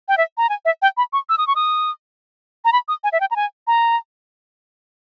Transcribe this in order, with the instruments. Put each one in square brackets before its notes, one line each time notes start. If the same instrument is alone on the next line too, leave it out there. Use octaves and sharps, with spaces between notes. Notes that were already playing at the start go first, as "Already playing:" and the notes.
[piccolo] G5
E5
A#5
G#5
E5
G5
B5
C#6
E6
D#6
C#6
D#6
A#5
B5
D#6
G#5
E5
G5
A#5
G#5
A#5